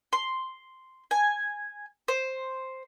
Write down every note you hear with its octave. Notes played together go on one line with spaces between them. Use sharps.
C6
G#5
C5